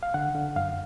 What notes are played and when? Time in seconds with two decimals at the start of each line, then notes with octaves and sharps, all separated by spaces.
0.03 F5
0.14 D3 F#5
0.35 D3
0.56 F#2 F5